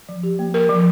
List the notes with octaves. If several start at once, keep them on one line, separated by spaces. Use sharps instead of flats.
F3
G4
A#3
A#4
F3